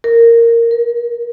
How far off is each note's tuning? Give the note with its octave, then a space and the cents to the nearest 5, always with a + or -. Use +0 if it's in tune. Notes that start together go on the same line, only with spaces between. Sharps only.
A#4 -10
A#4 +35